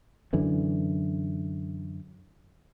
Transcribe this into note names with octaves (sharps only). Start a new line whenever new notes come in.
F#2 D3 E3